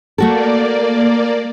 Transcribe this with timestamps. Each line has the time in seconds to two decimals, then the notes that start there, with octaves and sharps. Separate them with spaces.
0.18 A3 A#3 F#4 A4 D5